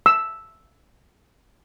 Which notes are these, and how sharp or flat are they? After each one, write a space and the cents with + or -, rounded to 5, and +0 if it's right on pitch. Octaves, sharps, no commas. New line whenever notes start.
E6 -5